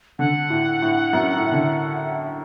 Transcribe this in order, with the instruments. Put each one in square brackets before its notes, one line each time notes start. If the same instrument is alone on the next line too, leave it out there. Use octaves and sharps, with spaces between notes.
[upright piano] D3 [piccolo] F#5
[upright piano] A2
A2
F#2
A2
D3